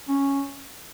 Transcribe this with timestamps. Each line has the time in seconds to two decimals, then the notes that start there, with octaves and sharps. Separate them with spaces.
0.08 C#4